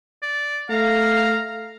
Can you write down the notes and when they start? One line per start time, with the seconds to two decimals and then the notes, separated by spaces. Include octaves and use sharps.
0.23 D5
0.70 A3 F5 A#5